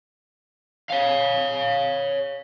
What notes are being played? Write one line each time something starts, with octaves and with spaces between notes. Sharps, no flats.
C#5 F5